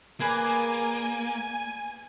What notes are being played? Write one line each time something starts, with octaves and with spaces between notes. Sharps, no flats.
A#3 G#4 B4 D5 G#5